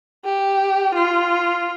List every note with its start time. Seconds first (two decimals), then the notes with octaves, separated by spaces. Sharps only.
0.25 G4
0.94 F4